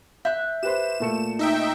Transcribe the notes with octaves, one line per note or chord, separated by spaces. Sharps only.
E5 F#6 G6
G4 B4 C5 E7
A#2 A3 C#7
D#4 E5 G5